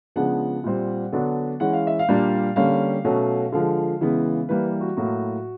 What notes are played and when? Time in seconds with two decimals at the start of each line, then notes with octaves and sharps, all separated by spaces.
0.16 C#3 F3 G#3 B3 D4 F#5
0.64 A#2 G3 C4
1.12 D3 F#3 B3 D4
1.60 E3 G#3 C#4 F#5
1.73 F5
1.87 E5
1.99 F5
2.09 A#2 G3 A#3 D4
2.56 D3 G3 A#3 C#4 F5
3.05 B2 F#3 A3 C#4
3.52 D3 F3 G#3 F5
4.01 C#3 E3 G#3 B3
4.49 E3 G3 A#3 B4
4.81 F#4
4.97 A2 F#3 A#3 F#4